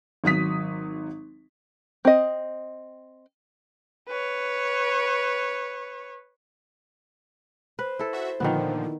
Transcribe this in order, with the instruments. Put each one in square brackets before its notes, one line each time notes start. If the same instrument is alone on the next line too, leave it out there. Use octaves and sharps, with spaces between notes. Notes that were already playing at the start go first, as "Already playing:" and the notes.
[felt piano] G#1 F#3 D#6 B6
[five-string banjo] C4 D#5
[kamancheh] B4 C#5
[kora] B4 [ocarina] C5
[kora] E4 A4
[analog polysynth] F#4 E5
[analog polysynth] A#2 D3 F3 [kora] D#3 B3
[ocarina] E4